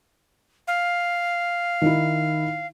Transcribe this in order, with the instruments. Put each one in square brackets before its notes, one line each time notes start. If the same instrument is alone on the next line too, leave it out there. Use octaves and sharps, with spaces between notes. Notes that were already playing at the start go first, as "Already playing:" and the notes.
[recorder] F5
[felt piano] D#3 D#4 E4